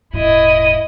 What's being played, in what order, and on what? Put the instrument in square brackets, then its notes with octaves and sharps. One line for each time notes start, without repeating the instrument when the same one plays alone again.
[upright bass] D#1 G#2 [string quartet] E4 D#5